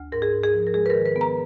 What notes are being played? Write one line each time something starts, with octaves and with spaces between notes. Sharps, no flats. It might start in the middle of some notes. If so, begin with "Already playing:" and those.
Already playing: D2
G#2 A#4
G#4
G#2
G#4
F3
A#4
G#3 G#4
B4
A#4
D#3
B4
B3
A#5